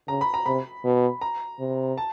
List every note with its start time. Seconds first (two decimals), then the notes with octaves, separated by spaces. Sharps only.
0.08 C#3 A#5
0.21 B5
0.34 A#5
0.46 C3 B5
0.85 B2
1.21 A#5
1.60 C3
1.98 A5